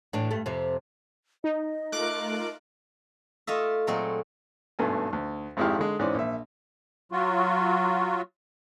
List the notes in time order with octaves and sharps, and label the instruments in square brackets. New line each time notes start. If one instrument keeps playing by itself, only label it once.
[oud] A2 E3 D4
G2 A3
F2 C3
[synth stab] D#4 [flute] D#5
[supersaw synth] A3 F4 A#4 [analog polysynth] D6 F#6
[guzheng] A3 F4 D#5 E5
A#2 F#3 G#3 A3 C4
[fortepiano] G#1 G2 B2 A3 G#5
D2
G#1 F2 G#3 E4 G4 F5
D3 G#3
G#2 E3 C4 C#4 D5
A#1 E5
[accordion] F#3 F4 F#4